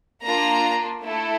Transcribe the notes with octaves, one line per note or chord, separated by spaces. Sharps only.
A#3 D4 F4 A#5
A3 E4 A4